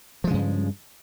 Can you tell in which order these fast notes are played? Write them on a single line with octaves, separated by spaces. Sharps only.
F3 G#3 C#3 G2